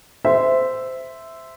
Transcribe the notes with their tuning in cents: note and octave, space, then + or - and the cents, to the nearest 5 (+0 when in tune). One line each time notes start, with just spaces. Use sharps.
C5 -15 E5 +0